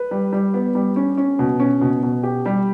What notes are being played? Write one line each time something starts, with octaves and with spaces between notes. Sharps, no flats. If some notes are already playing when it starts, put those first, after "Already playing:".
Already playing: B4
G3
G3
B3
G3
C#4
C#4
B2
C#4
B2
B2
G4
G3